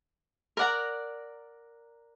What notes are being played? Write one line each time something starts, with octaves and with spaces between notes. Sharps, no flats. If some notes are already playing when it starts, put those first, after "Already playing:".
A#4 D5 F#5 A#5